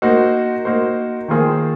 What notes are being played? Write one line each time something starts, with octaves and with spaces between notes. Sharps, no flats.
A#3 D#4 F#4 C5
A#3 D#4 F#4 C5
D#3 A#3 F4 G#4 C5